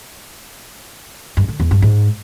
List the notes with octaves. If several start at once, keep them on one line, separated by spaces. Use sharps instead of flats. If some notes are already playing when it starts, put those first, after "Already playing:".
G2
D3
E2
G2
G#2